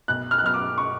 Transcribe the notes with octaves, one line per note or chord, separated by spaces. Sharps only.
B1 F#6
F6
F#6
B2 F#3 F6
D6
C#6